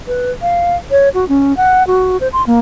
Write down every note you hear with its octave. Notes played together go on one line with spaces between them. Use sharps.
B4
F5
C#5
F#4
C#4
F#5
F#4
C5
C6
A#3